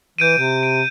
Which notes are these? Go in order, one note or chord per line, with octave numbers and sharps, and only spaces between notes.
E3 G6 D7 D#7
C3
D7